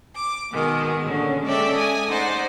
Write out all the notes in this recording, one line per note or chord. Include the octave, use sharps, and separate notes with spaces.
D6
B2 D#3 G#3
A#2 D3 C#4
G#3 C#4 A4 D5 E5 G5
G#5 D#6
A3 D#4 C5 D5 F#5